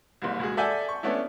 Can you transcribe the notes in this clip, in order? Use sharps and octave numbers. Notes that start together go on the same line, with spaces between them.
F#1 C2
C#2 F#4 G#4
A4 D5 E5 F#5 G#5 G6
C#6
A3 B3 C#4 D4 E4